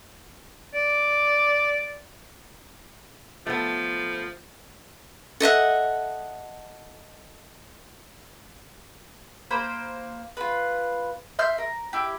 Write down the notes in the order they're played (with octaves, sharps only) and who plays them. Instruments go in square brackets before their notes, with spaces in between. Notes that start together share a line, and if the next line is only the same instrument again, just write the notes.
[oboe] D5
[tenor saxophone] F3 [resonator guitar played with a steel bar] A3 B3
[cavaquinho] A4 D#5 E5 F#5
[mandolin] A#3 C5 B5
F4 B4
E5 C6 F6 G6
A#4
E4 G4